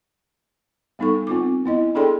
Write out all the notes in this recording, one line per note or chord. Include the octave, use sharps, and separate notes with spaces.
G3 B3 D#4 A4 C#6
C4 F4 D6
B3 E4 D#5
D4 G#4 A4 D5 G5 C6